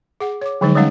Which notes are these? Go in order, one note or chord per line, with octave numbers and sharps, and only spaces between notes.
G#4 F#5
C#5 D6
D3 F3 F#3 G#3 D#4
G3 G#3 C#4 D#4 F5 F#5